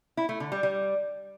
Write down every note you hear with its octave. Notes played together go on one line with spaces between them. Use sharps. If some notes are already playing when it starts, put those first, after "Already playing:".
E4
A3
D3
G3
G3